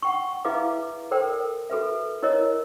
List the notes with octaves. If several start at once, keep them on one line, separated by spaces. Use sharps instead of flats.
F#5 G5 C#6
E4 G#4 B4 E5 F5 D6
A4 A#4 C5 D5 G5
F#4 A4 B4 E5
E4 A#4 C#5 D#5